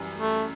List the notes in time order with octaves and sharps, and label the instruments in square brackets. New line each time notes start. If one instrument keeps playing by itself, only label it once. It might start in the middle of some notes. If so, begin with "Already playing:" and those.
Already playing: [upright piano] F#2 E3 G3
[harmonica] A3